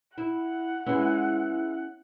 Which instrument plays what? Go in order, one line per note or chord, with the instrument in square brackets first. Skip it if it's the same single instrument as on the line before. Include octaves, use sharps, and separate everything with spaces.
[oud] E4 [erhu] F#5
[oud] G#3 B3 [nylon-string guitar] C#4 [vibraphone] E4 E5